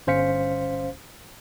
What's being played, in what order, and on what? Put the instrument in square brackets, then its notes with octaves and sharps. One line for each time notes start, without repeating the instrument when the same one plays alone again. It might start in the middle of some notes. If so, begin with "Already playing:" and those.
[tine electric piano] G1 C#4 C5 F5 B6 C#7